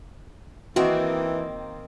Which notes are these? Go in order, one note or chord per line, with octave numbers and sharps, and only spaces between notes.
D#3 E3 A#3 C4 F#4